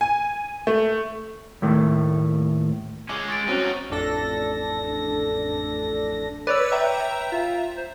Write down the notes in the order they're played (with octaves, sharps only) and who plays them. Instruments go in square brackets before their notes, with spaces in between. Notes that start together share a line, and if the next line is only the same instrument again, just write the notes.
[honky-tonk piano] G#5
A3
[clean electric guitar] D#2 A2 A3
[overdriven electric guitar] G#3 C#4 [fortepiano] D6
[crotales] C#6 A6 D7
[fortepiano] F#3 C4 C#4 [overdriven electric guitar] D#4 F#4
[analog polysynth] A1 F2 D4 A4 A#6
[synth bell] B4 C#5 E6 [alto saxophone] D5
[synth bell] E5 A#5 [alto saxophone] G5
[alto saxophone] F4
C5